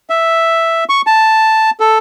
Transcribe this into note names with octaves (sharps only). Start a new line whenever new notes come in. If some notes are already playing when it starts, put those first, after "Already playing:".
E5
C#6
A5
A4